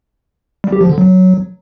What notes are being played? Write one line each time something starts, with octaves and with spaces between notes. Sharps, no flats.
G3
G4
F3
D3
F#3